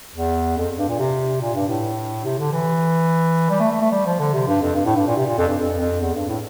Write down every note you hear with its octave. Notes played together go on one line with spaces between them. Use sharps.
E2
F2
G2
A#2
C3
A#2
G2
A2
C3
D3
E3
G3
A3
A3
A3
G3
F3
D3
C3
G2
F2
G2
A2
G2
A#2
C3
A#2
F2
G2
F2
F2
E2
G2
A2